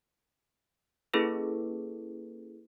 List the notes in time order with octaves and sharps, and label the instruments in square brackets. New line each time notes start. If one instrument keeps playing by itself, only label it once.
[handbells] A#3 C#4 E4 G#4 A4 B4